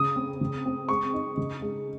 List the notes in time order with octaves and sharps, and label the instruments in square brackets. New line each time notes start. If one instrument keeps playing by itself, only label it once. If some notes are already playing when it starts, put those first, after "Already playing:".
Already playing: [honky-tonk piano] C#3 [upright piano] D#6
[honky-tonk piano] C4
C#3
C4
[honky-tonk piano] G#3 [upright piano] C#6
[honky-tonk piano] D#4
C#3
G#3